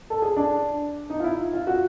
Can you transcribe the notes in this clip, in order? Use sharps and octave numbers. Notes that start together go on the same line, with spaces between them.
A4
G#4
D4
D#4
F4
E4
F4
F#4